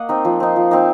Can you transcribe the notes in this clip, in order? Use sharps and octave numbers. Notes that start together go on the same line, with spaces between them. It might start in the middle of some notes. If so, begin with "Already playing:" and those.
Already playing: A#3 D#5 F#5
C4 D#4
F3
C4 D#4
F3
C4 D#4